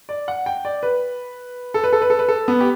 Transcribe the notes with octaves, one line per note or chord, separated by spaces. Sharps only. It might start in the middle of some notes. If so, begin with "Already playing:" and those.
D5
F#5
G5
D5
B4
A4
B4
A4
B4
A4
B4
A4
B3
G4